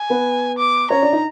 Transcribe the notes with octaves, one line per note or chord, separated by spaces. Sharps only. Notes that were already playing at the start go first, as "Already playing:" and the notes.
Already playing: G#5
B3 B4
D6
C#4 C#5 A#5
D4 D5
D#4 D#5